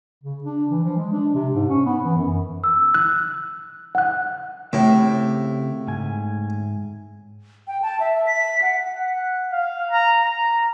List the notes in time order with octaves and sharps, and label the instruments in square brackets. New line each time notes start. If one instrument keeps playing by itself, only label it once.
[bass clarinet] C#3
D4
E3
F3
G#3
D4
C3
G#2
C#4
B3
E3
F#2
[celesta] E6
[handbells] F#6
F#5 F#6
[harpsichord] A2 [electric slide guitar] C#3 C4 G4
[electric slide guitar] G#2 G#5
[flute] G5
A5
E5
B6
F#5
[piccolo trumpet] F#5
F5
A#5
A#5